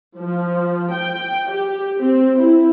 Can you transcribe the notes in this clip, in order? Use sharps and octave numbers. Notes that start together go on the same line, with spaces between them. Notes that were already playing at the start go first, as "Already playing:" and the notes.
F3
G5
G4
C4
E4